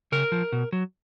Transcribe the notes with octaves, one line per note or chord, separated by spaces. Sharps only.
C#3 A#4
F3
B2
F#3